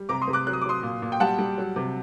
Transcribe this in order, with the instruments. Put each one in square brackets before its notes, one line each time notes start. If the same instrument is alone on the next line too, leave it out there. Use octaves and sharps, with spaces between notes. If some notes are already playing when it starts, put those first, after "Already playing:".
Already playing: [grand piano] G3
C3 A#5 D6
C6 D#6
C3
D6 F#6
F#3 F#6
D#6
D6
F#3 C6 D#6
A#2
A#2
G5
G3 F#5 A5
G3
F#3
C3